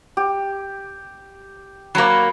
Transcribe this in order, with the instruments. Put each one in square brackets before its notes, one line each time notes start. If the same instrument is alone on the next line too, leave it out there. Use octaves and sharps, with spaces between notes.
[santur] G4
[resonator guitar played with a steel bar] F#3 A#3 [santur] D5 A#5 B5